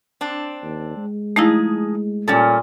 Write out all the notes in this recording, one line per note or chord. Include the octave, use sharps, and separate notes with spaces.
C4 D4
D#2
G#3
F3 A3 D#4 E4 G#4
A#2 G3 C#4 A4